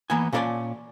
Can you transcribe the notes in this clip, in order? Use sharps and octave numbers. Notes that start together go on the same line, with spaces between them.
E3 A#3 B3 G#5
A#2 C#4 F#4 A#4 D5 A5